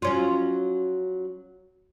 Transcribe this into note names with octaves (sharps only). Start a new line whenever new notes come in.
F#3 C#4 F4